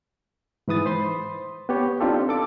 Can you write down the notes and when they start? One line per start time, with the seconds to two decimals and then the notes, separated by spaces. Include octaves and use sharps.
0.68 G#2 E3 B4 D#6 A6
0.86 C5 B5 C6
1.69 B3 G4 C#5
2.00 C4 D4 D#4 F4 G4 A4
2.29 A4 D6